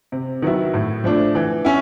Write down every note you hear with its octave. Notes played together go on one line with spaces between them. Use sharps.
C3
D#3 F#3 B3 E4
A2
F3 A3 D4
E3
C#4 E4